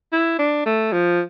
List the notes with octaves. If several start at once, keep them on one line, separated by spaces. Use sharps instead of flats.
E4
D4
A3
F3